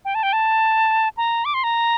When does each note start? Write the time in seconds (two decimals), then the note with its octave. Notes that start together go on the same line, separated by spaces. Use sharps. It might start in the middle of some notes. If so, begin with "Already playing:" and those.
0.05 G5
0.15 A5
0.23 G5
0.33 A5
1.17 A#5
1.45 D6
1.54 C6
1.64 A#5